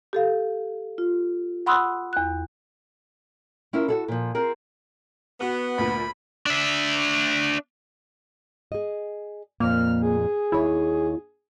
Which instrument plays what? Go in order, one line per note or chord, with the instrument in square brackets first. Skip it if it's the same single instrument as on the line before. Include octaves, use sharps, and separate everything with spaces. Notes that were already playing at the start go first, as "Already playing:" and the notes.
[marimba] G4 A4 F5
F4
F#5 B5 C6 D#6 E6 F#6
E2 F#6
[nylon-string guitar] C#4 E4 F4 A#4
F#4 G#4 A4
A#2 F3
C4 F4 G#4 A#4
[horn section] B3 [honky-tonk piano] F#4
[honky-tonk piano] D2 A#2 [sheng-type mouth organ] B5
[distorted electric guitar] D4 E5
[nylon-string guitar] G#4 D#5
[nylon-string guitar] F2 A#2 [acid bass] A#3 [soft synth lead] F6
[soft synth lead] G#4
[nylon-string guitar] D#2 C#5 [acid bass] E4